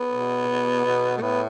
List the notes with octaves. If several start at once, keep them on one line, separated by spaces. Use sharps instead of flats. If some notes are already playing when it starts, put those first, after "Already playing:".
Already playing: B3
B2
B2
B2
A3
A2 B3